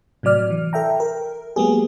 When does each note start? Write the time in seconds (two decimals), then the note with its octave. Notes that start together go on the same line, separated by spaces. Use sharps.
0.23 A2 C3 F#3 D5 F6
0.51 E3
0.73 A4 E5 G5 A#5
1.00 A#4
1.56 F#3 G#3 A#3 B3 G4 G#4